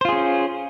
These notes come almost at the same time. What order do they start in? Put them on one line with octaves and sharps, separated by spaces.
C5 F4 G#4 C#4